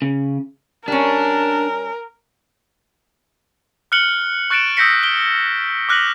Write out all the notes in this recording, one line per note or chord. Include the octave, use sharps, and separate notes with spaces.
C#3
G3 C#4 D4 A#4
F6 F#6 C#7 F#7 G7
C#6 F#6 A6 C#7 D7 E7
D#6 E6 G6 A#6 B6 C#7
D7 G7
D6 F6 F#6 A#6 B6 F#7